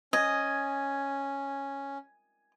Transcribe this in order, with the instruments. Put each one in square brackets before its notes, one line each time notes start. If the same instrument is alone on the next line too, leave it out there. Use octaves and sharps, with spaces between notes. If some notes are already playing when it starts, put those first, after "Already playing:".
[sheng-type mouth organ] C#4 [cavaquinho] D#5 [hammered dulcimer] G#5